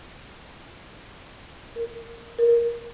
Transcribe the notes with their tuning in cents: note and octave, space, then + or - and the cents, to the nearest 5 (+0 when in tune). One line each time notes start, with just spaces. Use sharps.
A#4 -5
A#4 +15